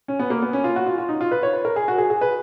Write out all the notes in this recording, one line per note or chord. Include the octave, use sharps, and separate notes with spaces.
C#4
B3
A#3
B3
C#4
F4
F#4
F4
F4
D#4
F4
B4
C#5
B4
A#4
G#4
F#4
G#4
G#4
B4